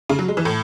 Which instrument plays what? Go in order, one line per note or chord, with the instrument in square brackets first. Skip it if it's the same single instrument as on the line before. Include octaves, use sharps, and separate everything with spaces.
[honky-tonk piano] C#3
F#3
G#3
E3
A2